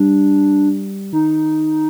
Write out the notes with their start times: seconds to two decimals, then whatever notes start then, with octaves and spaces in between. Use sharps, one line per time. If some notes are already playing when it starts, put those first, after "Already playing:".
Already playing: G3 D4
1.13 D#3 D#4